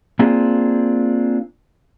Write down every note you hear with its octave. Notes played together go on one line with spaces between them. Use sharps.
A#3 C4 D4 F4 G#4